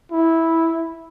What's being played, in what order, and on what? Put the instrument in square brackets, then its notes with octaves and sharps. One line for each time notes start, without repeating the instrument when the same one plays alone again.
[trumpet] E4